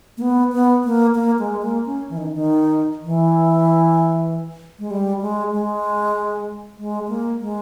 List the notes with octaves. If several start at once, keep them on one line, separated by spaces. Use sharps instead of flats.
A#3
B3
B3
A#3
A#3
G#3
A#3
C#4
E3
D#3
D#3
E3
G#3
G3
G#3
G#3
G#3
A#3
G#3